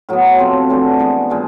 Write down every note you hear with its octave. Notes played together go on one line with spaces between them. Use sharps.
A2 F#3 B3
C3 F3 A3 C4
E3 A3 D4 F#4
E3 G#3 B3
A#2 F3 G#3